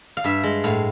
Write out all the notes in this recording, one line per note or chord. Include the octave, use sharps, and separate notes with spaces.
F5
G2 E5
G#3
A2 F5